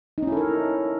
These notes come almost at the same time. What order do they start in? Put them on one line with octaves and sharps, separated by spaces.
D#4 C#4 E4 A4 A#4